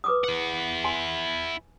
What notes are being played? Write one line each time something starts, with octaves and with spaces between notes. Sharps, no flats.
B4 D6 D#6
E4 F#5
G#5 C6